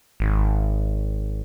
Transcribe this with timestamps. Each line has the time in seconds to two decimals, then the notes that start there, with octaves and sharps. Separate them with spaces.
0.20 G#1